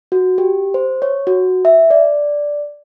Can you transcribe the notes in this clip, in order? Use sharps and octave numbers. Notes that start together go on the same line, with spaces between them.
F#4
G4
C5
C#5
F#4
E5
D5